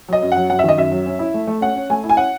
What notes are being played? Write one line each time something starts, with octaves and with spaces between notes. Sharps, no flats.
F#3 D#5
F#2
F#3 F#5
F#2 F#5
E5
D#3 D#5
F#2 E5
F#3
C#4
E4
A3
A3
C#4 F#5
C#4
A3 G#5
E4
G#5
C#4 F#5